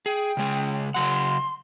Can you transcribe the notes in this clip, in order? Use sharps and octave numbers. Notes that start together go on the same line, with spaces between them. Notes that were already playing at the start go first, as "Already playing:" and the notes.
G#4 G5
C#3 G#3 G#4
C#3 F#3 F#5 C6